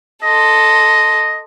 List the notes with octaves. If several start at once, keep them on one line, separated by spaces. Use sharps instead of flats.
A4 D#5 C6